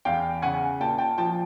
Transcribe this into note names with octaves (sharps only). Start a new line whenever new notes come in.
E2 F5 G5
C#3 F#5 G#5
A#2 G5 A5
G5 A5
F3 G5 A5